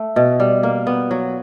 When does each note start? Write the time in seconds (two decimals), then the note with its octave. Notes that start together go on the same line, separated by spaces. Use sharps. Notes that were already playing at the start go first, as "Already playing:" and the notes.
Already playing: A3
0.16 B2
0.40 G3
0.63 A#3
0.87 B3
1.11 F#3